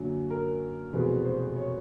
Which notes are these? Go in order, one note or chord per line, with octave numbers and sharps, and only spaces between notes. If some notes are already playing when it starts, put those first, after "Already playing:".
Already playing: F#2 D3 F#3 A#3
A#4
F1 E2 B2 G#3 C4 B4
C5
C#5